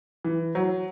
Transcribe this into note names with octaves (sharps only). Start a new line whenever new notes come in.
E3
F#3